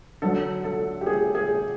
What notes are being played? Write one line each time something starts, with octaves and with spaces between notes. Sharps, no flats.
D3 F#3 A4
A4
G4
G#4
G#4